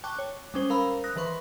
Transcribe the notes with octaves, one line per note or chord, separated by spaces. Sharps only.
G5 A5 C#6 D6 F#6
C#5
G3 G#3 C#4 C5
A#4 C5 F5 A#5 B5 E6
D#6 F#6 A#6
D#3 E3 B4 C6 C#6